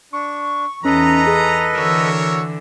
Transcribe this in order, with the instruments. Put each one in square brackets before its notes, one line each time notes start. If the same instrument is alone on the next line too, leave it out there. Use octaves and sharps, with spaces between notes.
[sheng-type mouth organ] D4 [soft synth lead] C#6
[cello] E2 D#4 [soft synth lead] C#4 [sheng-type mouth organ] A4 B4 D#5 [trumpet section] A#5
[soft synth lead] G#4
[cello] D3 E3 [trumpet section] F#4 A#4 C#5 [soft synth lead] E6